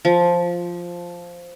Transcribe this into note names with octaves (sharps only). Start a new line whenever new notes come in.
F3